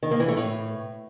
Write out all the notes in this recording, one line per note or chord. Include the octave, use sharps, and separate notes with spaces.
D#3
A#3
E3
A3
A2